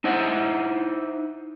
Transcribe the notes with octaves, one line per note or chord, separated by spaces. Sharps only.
D#4 E4 C5 D#5 F#5